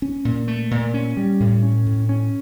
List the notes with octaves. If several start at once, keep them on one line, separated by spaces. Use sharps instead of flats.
C#4
A#2
A3
A#2
C#4
G3
A2
C#4
A2
C#4